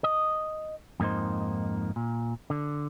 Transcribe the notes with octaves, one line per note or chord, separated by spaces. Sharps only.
D#5
F2 G#2 A#3 D#4 C5
A#2
D3